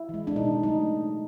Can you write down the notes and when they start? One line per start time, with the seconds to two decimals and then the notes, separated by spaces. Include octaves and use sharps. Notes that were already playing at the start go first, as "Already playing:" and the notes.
Already playing: E4
0.09 E3 G#3
0.27 D4
0.36 B2 D#4
0.63 F#3 A3 D#4